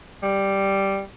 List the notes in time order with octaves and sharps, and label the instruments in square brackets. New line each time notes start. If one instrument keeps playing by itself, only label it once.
[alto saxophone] G3